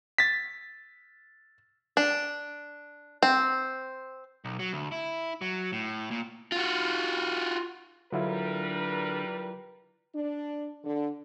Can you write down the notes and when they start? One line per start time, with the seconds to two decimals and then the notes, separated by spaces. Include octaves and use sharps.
0.18 A6 B6
1.97 D4
3.23 C4
4.45 B1
4.59 F#3
4.73 D2
4.92 E4
5.41 F#3
5.72 A2
6.11 A#2
6.52 F4 F#4
8.12 D3 F#3 G3 E4 F4 A#4 B4
10.14 D4
10.84 D3